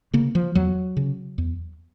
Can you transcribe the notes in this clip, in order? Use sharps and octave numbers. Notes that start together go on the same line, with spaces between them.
C#3 A#3
F3
E2 F#3
C#3
E2